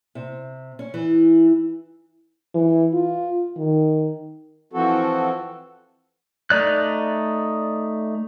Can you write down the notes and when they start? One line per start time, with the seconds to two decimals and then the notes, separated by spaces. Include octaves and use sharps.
0.15 C3
0.79 C#4
0.94 E3
2.55 E3
2.93 F4
3.58 D#3
4.73 E3 F3 C4 F#4 A4
6.50 A3 D#4 D5 F#6